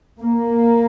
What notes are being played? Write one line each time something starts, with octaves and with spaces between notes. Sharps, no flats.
A#3